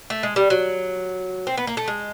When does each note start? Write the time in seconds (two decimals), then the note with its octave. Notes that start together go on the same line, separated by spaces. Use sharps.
0.10 A3
0.23 G#3
0.36 G3
0.50 F#3
1.47 C4
1.57 B3
1.67 A#3
1.77 A3
1.88 G#3